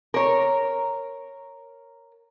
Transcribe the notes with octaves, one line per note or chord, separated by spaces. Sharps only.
A#4 C#5